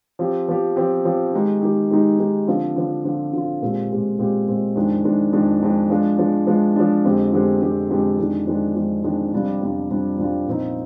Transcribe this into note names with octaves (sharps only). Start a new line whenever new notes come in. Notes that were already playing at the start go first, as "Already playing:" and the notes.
F3 C4 G4
F3 C4 G4
F3 C4 G4
F3 C4 G4
D#3 G#3 D#4 G4
D#3 G#3 D#4 G4
D#3 G#3 D#4 G4
D#3 G#3 D#4 G4
D3 F3 C4 F4
D3 F3 C4 F4
D3 F3 C4 F4
D3 F3 C4 F4
A#2 G#3 C4 G4
A#2 G#3 C4 G4
A#2 G#3 C4 G4
A#2 G#3 C4 G4
F2 D#3 G#3 D4
F2 D#3 G#3 D4
F2 D#3 G#3 D4
F2 D#3 G#3 D4
F3 G#3 D4
F3 G#3 D4
F3 G#3 D4
F3 G#3 D4
F2 D3 G#3 C4 G4
F2 D3 G#3 C4 G4
F2 D3 G#3 C4 G4
F2 D3 G#3 C4 G4
F2 D#3 G#3 D4
F2 D#3 G#3 D4
F2 D#3 G#3 D4
F2 D#3 G#3 D4
F2 C3 G3 D4 F4
F2 C3 G3 D4 F4
F2 C3 G3 D4 F4
F2 C3 G3 D4 F4
A#2 F3 C4 D#4